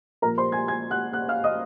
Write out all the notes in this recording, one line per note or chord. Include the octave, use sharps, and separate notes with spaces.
A#2 F3 A#4 A#5
C5 C6
G#5 G#6
G#5 G#6
F#5 F#6
F#5 F#6
F5 F6
D#5 D#6